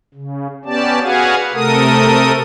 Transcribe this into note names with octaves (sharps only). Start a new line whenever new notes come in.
C#3
B3 C#4 G4 D5 A5
F#4 G#4 B4 F5 F#5 G#5
C3 A3 A4 A#4 D#6